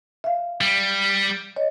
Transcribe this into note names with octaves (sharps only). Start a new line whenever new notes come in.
E5 F5
G3
C#5 D#5